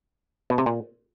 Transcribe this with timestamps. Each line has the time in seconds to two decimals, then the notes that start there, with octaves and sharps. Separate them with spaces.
0.50 B2
0.58 C3
0.66 A#2